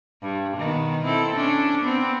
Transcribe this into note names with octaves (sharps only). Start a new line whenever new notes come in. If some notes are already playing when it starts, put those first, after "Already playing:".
G2
B2 D#3 B3
C4 E4 A4
C#4 D4
B3 C4